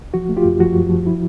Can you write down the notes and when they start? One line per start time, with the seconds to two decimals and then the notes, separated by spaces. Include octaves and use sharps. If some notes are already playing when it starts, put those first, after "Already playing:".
0.14 F3 F#4
0.29 A3
0.37 F4 G4
0.45 F#2
0.60 F3 F#4
0.75 F#2
0.90 F3
1.07 E4